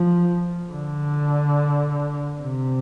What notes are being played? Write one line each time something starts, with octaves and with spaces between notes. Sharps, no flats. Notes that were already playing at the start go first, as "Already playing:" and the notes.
Already playing: F3
D3
C3